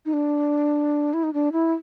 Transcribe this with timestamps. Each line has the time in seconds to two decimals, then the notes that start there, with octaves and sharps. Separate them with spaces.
0.05 D#4
0.13 D4
1.13 E4
1.23 D#4
1.33 D4
1.52 E4